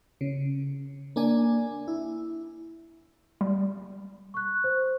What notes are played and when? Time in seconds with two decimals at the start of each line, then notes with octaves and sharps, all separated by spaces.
0.21 C#3
1.16 A#3 D4 G#5
1.88 E4
3.41 G3
4.34 C#6 F#6
4.64 C5